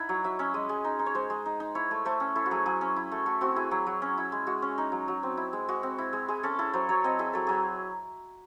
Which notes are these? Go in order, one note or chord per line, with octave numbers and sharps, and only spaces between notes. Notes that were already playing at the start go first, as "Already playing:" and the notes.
Already playing: D#4 E4 F#5
F#3
F#3 E5
C#4 E5
G#3 D#5
G#3
D#4
D#4
C#5
G#3 C5
G#3
D#4
D#4
E4 C#5
A3
A3 C5
C#4
E4 A4
F#4
F#3 G#4
F#3 G#4
C#4
E4
A3
A3 F#4
C4 F#4
E4 G#4
F#3
F#3
C#4
E4
G#3
G#3 F#4
C#4
D#4
F#3
F#3
C4
E4
G#3
G#3 F#4
C4
E4
G#3
G#3 G#4
C#4 A4
E4 A4
F#3 C5
F#3 C#5
C4 D#5
E4 G#4
F#3 A4
F#3 G#4